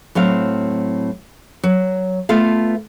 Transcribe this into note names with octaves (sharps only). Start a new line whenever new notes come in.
A2 F#3 C4 F5
F#3
A3 B3 F4 A4 F5